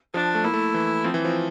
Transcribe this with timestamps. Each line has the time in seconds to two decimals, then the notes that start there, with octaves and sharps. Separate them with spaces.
0.14 F3 D4
0.35 A3
0.44 A#3 E4
0.54 A3
0.74 E3
1.04 F3 C4
1.14 E3
1.25 F3